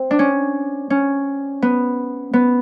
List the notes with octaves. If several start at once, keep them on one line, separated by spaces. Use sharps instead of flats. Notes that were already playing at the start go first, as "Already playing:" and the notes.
Already playing: C4
D4
C#4
C#4
B3
B3